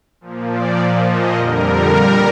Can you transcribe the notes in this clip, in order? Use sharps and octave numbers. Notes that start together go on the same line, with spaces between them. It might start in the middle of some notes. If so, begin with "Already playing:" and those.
A#2 F3
D5
A#2 F3
D#5
F2 D3 G3 A#4
A#2 G3